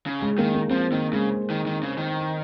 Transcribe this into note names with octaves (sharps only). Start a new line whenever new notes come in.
C#3
G#3
D#3 A#3
A#3
F3 C4
D#3 A#3
C#3 G#3
D#3
D#3
C#3
D#3